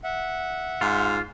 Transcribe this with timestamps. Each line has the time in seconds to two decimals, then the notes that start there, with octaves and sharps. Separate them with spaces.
0.04 E5 F#5
0.81 G#2 F4